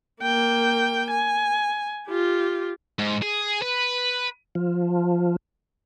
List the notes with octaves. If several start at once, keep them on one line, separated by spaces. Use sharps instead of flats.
A#3 G5
G#5
F4 G4
G#2
G#4
B4
F3